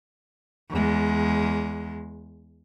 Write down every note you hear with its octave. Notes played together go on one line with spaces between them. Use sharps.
E2 G#3